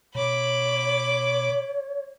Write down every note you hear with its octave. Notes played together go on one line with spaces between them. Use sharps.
B2 C#5 B5 D6